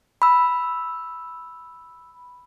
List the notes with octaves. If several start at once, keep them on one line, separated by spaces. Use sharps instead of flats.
B5 E6